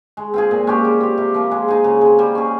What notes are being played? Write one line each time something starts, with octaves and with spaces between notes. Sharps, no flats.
G#3
C4 F4 G#4
A#2
G#3 C#4 G4
G3
C4 G4
C3
F3 A#3
G#3
D#4 G#4
C#3
G#3 C4
G3
C#4 G#4